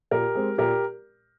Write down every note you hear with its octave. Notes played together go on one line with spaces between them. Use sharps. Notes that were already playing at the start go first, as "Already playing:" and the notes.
A#2 G4 A#4
G#3 C4
A#2 G4 A#4